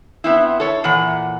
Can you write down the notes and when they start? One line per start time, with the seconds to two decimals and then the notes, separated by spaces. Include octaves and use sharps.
0.24 B3 C4 E4
0.60 A4 C#5
0.84 A#2 E3 F#5